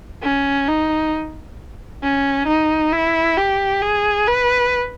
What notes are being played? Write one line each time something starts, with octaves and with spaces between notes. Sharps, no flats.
C#4
D#4
C#4
D#4
E4
G4
G#4
B4